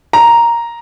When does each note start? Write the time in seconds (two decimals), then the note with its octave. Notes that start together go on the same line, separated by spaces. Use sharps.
0.13 A#5